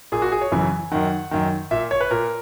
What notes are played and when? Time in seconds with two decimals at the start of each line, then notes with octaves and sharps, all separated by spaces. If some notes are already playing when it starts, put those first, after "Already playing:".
0.12 A#2 G#4
0.22 F#4
0.32 G#4
0.41 C#5
0.52 F#2 C#3 E3 G#5
0.92 F#2 D#3 F#5
1.31 F#2 D#3
1.71 A#2 E5
1.91 C#5
2.01 B4
2.11 A#2 A#4